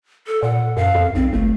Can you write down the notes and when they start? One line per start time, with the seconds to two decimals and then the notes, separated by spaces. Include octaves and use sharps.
0.27 A4
0.43 A#2 F#5
0.77 F#2 F5
0.95 F2
1.15 B1 C4
1.33 G1 A3